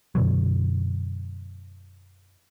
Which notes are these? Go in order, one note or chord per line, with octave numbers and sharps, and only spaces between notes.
F#2 B2 D3 F#3